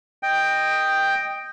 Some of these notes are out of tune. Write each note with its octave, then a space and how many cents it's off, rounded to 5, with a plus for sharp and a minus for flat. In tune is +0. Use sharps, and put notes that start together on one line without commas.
D#5 -5 G5 +5